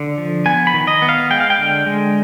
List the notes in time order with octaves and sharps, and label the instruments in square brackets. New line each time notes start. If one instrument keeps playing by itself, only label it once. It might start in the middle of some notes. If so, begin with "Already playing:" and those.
Already playing: [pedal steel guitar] D3
F3
B3 G#5
B5
D#3
D#5
B3
F5
G#3 G5
F5
G5
D3
G#3